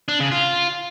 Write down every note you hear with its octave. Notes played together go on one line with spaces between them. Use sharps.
D4
C#3
F4